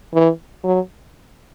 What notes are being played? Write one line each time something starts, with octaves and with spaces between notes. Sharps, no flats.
E3
F#3